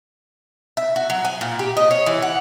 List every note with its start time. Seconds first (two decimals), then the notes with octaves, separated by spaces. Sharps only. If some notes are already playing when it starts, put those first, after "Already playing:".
0.77 E5
0.96 F#4
1.10 F#3
1.25 G#5
1.41 A#2
1.59 G4
1.77 D#5
1.91 C#5
2.06 E3
2.22 F#5